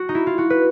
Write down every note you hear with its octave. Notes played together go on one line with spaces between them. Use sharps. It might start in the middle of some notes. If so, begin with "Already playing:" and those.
Already playing: F#4
D#4
E4
F4
F#4
B4